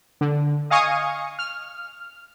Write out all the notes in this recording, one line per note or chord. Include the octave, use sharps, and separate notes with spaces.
D3
D#5 F5 G#5 C#6 D#6
F6